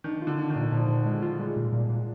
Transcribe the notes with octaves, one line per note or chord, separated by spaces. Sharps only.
D#3 D4
F4
D3
D4
D#3
A#2
A#2 F3
A#2
G#3
F4
G3 G#3
A#2
A#2
A#2